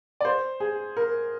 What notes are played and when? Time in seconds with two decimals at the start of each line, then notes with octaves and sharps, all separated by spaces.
0.21 D5
0.25 C5
0.60 G#4
0.97 A#4